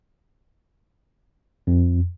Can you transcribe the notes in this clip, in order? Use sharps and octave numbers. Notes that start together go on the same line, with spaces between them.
F2